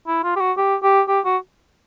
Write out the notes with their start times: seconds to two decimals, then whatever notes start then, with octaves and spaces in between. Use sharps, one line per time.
0.07 E4
0.24 F4
0.36 G4
0.40 F#4
0.58 G4
0.83 G4
1.08 G4
1.25 F#4